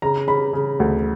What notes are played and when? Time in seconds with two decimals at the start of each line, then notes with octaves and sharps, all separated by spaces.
0.02 C#3 A#5
0.27 C#3 B5
0.53 C#3
0.80 D2